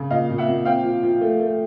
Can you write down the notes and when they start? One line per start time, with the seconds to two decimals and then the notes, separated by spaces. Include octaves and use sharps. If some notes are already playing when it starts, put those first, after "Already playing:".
Already playing: C#3
0.10 A#2 D#5 F5
0.30 A#2
0.38 E5 F#5
0.48 A#2
0.65 C4 F5 G5
0.84 F3
1.03 F3
1.21 A3
1.39 A3